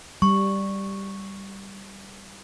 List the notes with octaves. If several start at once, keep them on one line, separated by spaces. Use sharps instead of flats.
G3 C#6